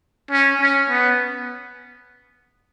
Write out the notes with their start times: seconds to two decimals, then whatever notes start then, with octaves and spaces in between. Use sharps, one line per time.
0.31 C#4
0.61 C#4
0.90 B3